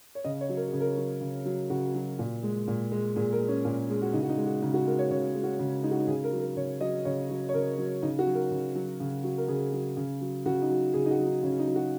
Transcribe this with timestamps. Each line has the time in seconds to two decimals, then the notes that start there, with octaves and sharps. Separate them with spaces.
0.15 C#5
0.24 C#3 D#5
0.41 C#5
0.49 F#3
0.57 A#4
0.68 G#4
0.73 C#3
0.80 A#4
0.97 F#3
1.21 C#3
1.46 F#3
1.70 C#3 F#4
1.95 F#3
2.19 A#2
2.43 G#3
2.68 A#2
2.92 G#3
3.16 A#2 G#4
3.32 A#4
3.40 G#3
3.48 C#4
3.65 A#2
3.89 G#3 G#4
4.02 F#4
4.13 C#3 D#4
4.23 F#4
4.29 D#4
4.38 G#3
4.46 F#4
4.62 C#3 D#4
4.74 F#4
4.86 G#3 A#4
4.99 C#5
5.10 C#3 C#5
5.35 G#3
5.43 F#4
5.59 C#3
5.83 G#3 D#4
5.91 F#4
5.99 D#4
6.07 C#3 G#4
6.24 A#4
6.33 F#3
6.40 A#4
6.56 C#3 C#5
6.81 F#3 D#5
7.05 C#3 C#5
7.30 F#3
7.49 C#5
7.54 C#3 A#4
7.78 F#3
8.03 C#3 D#4
8.19 F#4
8.27 F#3
8.35 A#4
8.51 C#3
8.75 F#3
9.00 C#3
9.24 F#3
9.38 A#4
9.48 C#3 G#4
9.73 F#3
9.97 C#3
10.21 F#3
10.46 C#3 F#4
10.62 D#4
10.70 F#3
10.94 C#3 G#4
11.06 D#4
11.11 F#4
11.19 F#3
11.27 D#4
11.43 C#3 C#4
11.59 D#4
11.67 F#3
11.76 F#4